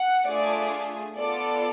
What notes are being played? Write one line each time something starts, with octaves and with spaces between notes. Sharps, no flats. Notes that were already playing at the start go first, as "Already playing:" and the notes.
Already playing: F#5
A3 D4 F4 G#4 D5
B3 F4 A4 D5